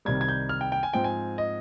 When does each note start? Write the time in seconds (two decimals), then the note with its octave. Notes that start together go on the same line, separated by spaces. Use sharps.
0.05 C2 C3 D#3 G3 G#6
0.21 G#6
0.28 G6
0.49 F6
0.61 G5
0.72 G5
0.83 G#5
0.93 G#2 F3 C4 G5
1.04 G#5
1.38 D#5